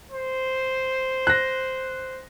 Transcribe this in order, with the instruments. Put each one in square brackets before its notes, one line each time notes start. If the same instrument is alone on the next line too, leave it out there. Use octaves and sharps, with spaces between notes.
[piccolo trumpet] C5
[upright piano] F#6 A#6